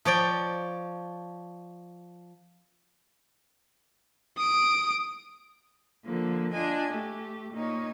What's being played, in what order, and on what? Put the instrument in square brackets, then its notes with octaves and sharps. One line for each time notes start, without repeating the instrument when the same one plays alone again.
[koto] F3 C#5 D5 G5
[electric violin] D#6 D7
[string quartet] D3 F3 A#3
D4 F4 D#5 G#5
A3 G4
A#2 D#4 C#5